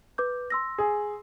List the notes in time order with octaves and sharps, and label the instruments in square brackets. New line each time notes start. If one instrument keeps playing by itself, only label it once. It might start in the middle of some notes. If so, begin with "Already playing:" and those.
[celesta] B4 D6 G6
C6 E6 A#6
[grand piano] G#4